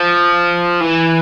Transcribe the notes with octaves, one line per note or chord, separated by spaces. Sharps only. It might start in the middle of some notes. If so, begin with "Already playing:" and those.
Already playing: F3
E3